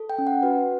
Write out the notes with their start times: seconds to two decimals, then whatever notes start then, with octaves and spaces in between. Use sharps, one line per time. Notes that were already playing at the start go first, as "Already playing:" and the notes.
Already playing: A4
0.10 G5
0.18 C#4
0.27 F#5
0.43 F#4 B4